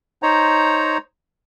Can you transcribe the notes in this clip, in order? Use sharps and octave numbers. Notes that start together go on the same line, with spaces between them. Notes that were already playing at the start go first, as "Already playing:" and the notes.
D#4 C5 C#5 A#5